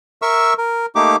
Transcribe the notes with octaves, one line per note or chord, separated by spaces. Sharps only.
A#4 E5 C#6 E6
A#4
A3 A#3 D#4 G4 D6